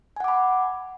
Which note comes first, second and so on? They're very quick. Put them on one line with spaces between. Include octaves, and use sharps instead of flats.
G#5 F#5 D6 B5